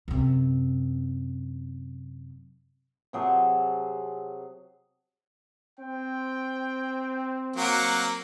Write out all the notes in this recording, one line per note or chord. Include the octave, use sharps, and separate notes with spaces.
F#2 C3
C3 F#3 G#4 A5
C4 G5
F#3 A#3 F#5